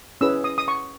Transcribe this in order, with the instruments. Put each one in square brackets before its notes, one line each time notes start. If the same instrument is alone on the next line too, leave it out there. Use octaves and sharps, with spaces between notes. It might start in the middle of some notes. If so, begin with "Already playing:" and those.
[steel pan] C#4 E4 G#4 B4 E6
D#6
D#6
C#6